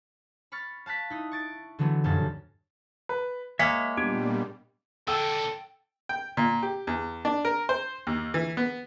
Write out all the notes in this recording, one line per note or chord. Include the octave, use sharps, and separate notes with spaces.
B5 C#6 F6 A6
F5 A5 F#6 B6
D#4 E4
C#6 A6 D7
D3 E3 F#3 A3 B3
F1 F#2 A#2 A5
B4
G#3 A#3 C#5 E5 F6 B6
A#2 G3 B3 D4 G4 G#6
A#2 D3 A4 G5 E6
G5
A#2
G4
E2
D4
A#4
C5
D#2
E3
B3